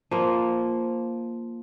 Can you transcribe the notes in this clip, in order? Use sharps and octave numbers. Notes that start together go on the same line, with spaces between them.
F3 A#3